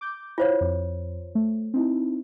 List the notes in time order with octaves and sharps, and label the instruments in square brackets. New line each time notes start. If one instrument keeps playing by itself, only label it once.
[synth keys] D6 G6
[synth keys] E4 F5 [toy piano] F4 C5 C#5
[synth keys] F2
A3
C4 D#4 E4